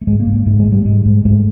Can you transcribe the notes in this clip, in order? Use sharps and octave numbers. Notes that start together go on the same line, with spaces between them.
A3
G#2 G#3
A#3
G#2
A#3
G#2 A3
G#3
G#2
G3
G#2 G#3
G#2
G#2 A3